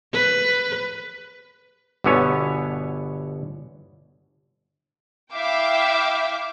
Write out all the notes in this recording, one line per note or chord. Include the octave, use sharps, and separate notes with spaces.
B4
G1 B2 D3 B3 C#4 C#5
E4 E5 F5 G5 D6